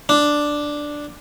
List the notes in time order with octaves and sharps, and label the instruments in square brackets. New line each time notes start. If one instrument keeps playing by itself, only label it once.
[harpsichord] D4